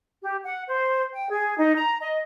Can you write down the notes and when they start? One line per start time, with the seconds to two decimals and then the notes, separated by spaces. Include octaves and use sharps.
0.22 G4
0.45 F#5
0.67 C5
1.13 G5
1.30 G#4
1.58 D#4
1.75 A#5
2.01 D#5